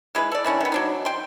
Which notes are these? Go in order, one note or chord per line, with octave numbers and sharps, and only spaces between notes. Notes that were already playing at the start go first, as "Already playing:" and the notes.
E3 G#3 E4 B4
A4 D5
D#3 E3 C#4 D4
D#3 B3
F#3 D4 D#4
G5 C6